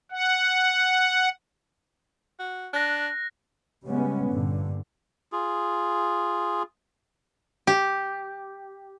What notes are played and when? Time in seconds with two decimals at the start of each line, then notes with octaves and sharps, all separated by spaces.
0.11 F#5
2.39 F#4
2.73 D4 F#6 A#6
3.85 C#3 G3 G#3 B3 C#4
4.30 G2 A#2 D3
5.32 F4 G#4
7.67 G4